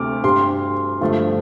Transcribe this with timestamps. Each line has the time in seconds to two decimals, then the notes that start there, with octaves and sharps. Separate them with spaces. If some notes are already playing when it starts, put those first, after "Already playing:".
Already playing: D2 C3 A3 D6 F6
0.24 G2 G3 C6
1.01 G2 D3 F3 A3